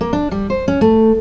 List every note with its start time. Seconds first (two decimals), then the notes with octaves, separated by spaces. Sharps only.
0.01 A#3
0.13 D4
0.31 G3
0.50 C5
0.68 C#4
0.81 A3